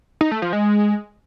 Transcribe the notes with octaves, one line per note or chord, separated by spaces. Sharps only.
D#4
A3
F3
G#3